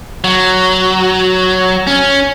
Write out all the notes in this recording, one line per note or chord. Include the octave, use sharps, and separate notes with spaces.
F#3
C#4